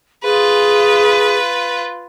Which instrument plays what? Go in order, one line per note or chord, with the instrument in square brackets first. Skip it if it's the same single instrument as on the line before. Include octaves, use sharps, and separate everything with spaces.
[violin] F4 B4 [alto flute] G#4